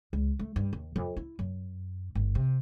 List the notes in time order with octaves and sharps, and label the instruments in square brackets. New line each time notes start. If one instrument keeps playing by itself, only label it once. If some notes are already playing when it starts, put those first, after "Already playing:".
[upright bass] C#2
A3
G2
D#2
F2
E4
F#2
G1
C3